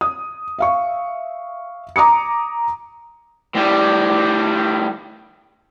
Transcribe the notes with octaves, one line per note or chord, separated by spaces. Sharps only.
D#6
E5 F5 C#6
A#5 D6 D#6 C#7
A2 G3